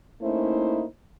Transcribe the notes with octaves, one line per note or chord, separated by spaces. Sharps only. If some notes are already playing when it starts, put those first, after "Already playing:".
A3 A#3 C#4 D#4 E4 C5